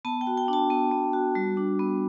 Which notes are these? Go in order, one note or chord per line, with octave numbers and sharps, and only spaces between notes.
B3 A5
G5
F#4
G5
D4 A5
B3
B3
F#4
G3
D4
B3